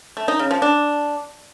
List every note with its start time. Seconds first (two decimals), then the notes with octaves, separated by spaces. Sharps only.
0.17 A3
0.28 D#4
0.39 C#3
0.51 F3
0.62 D4